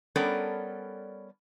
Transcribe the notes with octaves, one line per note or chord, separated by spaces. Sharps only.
G3 B3 C#4 A4 A#4 D5